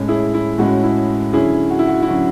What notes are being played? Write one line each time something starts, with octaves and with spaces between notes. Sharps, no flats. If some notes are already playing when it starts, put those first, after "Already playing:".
Already playing: A2 G#3 C#4
E4 G#4
E4
A2 G#3 C#4 F#4
E4
D3 F#3 C#4 E4 G#4
F#4
E4
F#4
E4
D3 F#3 C#4 F#4